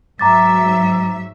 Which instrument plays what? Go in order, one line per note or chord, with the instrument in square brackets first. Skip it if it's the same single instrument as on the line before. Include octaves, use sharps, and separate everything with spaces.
[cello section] G#2 F#3 E5 [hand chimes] A#5 D6 A6